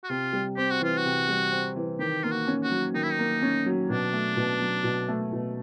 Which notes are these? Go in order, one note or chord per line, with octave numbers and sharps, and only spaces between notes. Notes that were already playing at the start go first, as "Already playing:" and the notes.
F#4
C3 F4
G3
C4 G4
F#4
E3 F4
F#4
C3
G3
C4
E3
D#3 G4
A#3 F4
F#4
C#4
F#4
F#3
D#3 D#4
E4
D#4
A#3
C#4
F#3
B2 D4
A3
B2
F#3
B2
A3
B2